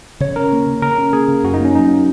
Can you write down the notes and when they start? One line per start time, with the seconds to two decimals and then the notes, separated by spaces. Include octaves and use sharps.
0.20 C#3 C#5
0.36 C#4 A#4
0.52 A#3
0.67 C#3
0.82 C#3 A#4
0.98 C#4
1.13 A#3 G#4
1.28 C#3
1.43 F#2 F#4
1.54 D#4
1.60 A#3 C#4
1.74 F#3 D#4